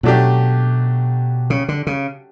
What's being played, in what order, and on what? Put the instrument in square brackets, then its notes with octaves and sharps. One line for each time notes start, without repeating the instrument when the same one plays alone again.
[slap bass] B2 [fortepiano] F#3 A3 D4 G4
[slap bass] C#3
D3
C#3